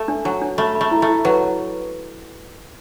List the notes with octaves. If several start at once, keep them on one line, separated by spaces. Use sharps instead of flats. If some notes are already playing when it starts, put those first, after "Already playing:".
Already playing: A3
D4
F#3 D4
D4
A3 B5
B5
A3
E4
A3
E4
F#3 B4